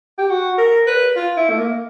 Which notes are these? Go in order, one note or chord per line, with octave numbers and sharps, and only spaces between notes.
G4
F#4
A#4
B4
F4
E4
A3
A#3